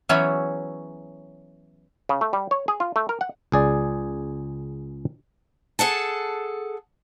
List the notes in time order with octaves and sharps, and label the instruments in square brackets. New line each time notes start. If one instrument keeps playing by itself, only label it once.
[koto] E3 F#3 B3 C#4 G#4 E5
[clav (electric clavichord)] C#3
A3
G3
C#5
G#4
F4
A3
A#4
F#5
C#2 G#4 D5
[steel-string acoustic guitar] G#4 A4 F#5 A5